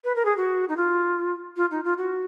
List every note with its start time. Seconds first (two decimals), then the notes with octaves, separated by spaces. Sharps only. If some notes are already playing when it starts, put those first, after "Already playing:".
0.04 B4
0.15 A#4
0.25 G#4
0.37 F#4
0.68 D#4
0.76 F4
1.56 F4
1.71 D#4
1.84 F4
1.97 F#4